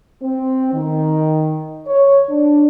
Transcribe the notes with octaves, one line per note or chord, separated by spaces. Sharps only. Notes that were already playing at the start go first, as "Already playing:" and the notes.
C4
D#3
C#5
D4